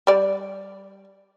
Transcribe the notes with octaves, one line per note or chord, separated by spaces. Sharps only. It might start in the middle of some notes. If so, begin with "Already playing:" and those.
G3 D5